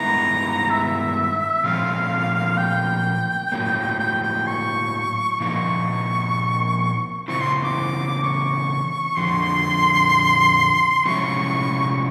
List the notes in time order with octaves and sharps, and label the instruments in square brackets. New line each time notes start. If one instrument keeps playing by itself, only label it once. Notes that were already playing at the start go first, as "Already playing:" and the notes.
Already playing: [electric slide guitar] G2 D#3 G#3 B3 E4 [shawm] A#5
[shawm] E5
[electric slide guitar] A#2 F3 A3 C4 F4 [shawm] F5
[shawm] G5
[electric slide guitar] A2 F#3 A#3
[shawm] G5
G5
C#6
[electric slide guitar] A#2 F3 A#3 D#4 [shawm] C#6
[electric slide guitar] C#3 E3 C4 E4 [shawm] C#6
[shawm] C6
D6
C#6
[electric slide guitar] F2 D3 F3 [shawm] C6
[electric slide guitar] C3 F3 G#3 C#4 E4 [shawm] C#6